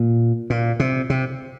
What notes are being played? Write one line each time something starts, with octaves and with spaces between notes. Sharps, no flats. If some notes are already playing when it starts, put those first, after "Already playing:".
Already playing: A#2
A#2
C3
C3